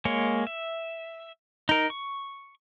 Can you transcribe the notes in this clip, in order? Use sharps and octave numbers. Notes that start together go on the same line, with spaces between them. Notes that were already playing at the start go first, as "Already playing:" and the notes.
G#3 A#3 C#5
E5
D#4 A#4
C#6